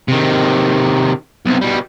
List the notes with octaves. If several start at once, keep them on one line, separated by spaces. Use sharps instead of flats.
C3 D#3
B1 C3
B2 G3